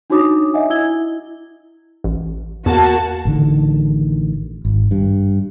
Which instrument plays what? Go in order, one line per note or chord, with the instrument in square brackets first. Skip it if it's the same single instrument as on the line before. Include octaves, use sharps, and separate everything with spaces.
[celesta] D4 D#4 F#4 C#5 D6 D#6
D#5 E5 F#5 G#5
E4 E6 G#6 G7
E4
[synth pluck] A1
[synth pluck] E2 [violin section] A#3 F#4 A5
[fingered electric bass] A1 D3 D#3
G#1
G2